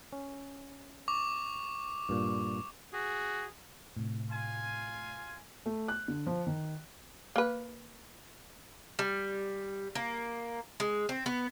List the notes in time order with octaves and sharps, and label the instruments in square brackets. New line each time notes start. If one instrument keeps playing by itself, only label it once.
[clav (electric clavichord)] C#4
[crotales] C#6 D6 F7
[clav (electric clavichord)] G2 A#2
[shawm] F#4 [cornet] G#4
[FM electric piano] A2 C3
[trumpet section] F4 G#5
[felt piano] A3
F#6
D3
F3
D#3
[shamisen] A#3 B4
[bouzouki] G3
A#3
G#3
C4
B3